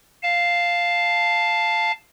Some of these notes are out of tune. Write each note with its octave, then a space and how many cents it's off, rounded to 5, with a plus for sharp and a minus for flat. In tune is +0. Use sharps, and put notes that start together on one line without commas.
F5 +0 A5 +0